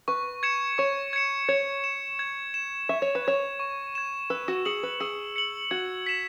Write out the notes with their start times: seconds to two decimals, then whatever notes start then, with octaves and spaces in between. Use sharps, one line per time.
0.08 B4 C#6
0.43 G#6 C#7 E7
0.78 C#5 C#6
1.13 G#6 C#7 E7
1.49 C#5 G#6
1.84 E7
2.19 G#6
2.54 E7
2.89 E5 C#6
3.02 C#5
3.15 B4
3.25 C#5 G#6 E7
3.59 C#6
3.95 G#6 E7
4.30 B4 E6
4.48 F#4
4.65 G#4 C#7 F#7
4.83 B4
5.00 G#4 E6
5.36 C#7 F#7
5.71 F#4 G#6
6.06 B6 E7